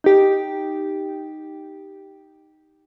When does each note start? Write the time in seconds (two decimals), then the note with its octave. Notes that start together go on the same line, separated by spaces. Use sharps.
0.04 D#4 G4